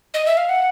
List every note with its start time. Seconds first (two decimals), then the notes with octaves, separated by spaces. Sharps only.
0.14 D#5
0.26 E5
0.37 F5
0.49 F#5